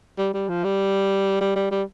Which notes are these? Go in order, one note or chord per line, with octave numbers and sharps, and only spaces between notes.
G3
G3
F3
G3
G3
G3
G3